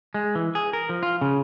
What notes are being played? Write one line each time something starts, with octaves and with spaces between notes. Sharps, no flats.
G#3
E3
G#4
A#4
F3
F4
C#3